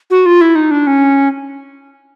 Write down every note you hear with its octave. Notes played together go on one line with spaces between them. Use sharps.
F#4
F4
E4
D#4
D4
C#4